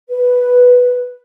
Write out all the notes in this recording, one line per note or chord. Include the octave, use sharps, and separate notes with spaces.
B4